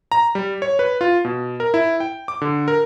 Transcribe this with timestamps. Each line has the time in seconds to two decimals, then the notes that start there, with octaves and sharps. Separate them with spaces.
0.12 A#5
0.35 G3
0.62 C#5
0.79 B4
1.01 F4
1.25 B2
1.60 A#4
1.74 E4
2.00 G5
2.28 D6
2.41 D3
2.68 A#4